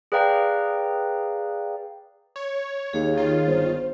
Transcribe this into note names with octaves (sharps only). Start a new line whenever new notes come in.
G#4 B4 D5 F5 G5 A#5
C#5
D#2 G#4 C#5 F5
D#3 F4
G1 C5